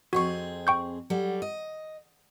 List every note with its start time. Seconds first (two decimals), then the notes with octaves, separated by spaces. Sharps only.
0.13 F2 C4 F#4 G#4 C#6
0.67 G5 C#6 G6
1.10 F#3 G3 A4
1.42 D#5